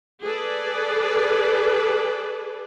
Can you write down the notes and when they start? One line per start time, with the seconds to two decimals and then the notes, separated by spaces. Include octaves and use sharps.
0.23 G#4 A4 B4 D5